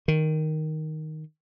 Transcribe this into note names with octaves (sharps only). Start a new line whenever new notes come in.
D#3